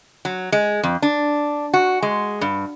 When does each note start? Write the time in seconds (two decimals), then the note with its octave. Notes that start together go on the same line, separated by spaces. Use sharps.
0.25 F#3
0.52 G#3
0.83 F2
1.02 D4
1.74 F#4
2.02 G#3
2.41 G2